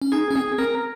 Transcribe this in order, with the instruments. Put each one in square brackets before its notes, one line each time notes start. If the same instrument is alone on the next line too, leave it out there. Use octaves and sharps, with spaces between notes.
[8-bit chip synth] C#4
[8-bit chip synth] D#4 [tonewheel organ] G#4
[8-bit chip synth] C#4
[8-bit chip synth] C4 [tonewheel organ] G#4
[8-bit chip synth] C4 [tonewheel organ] A#4